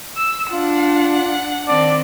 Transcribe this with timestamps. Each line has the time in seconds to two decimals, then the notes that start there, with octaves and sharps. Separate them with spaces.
0.17 E6
0.52 D4 F4 F#5
1.68 D#3 C4 D5 A5